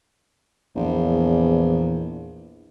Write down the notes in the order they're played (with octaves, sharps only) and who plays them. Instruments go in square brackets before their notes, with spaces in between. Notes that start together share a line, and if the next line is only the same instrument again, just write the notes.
[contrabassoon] A#1 [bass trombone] E2